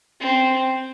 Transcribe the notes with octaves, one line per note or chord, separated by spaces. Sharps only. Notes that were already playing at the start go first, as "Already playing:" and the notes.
C4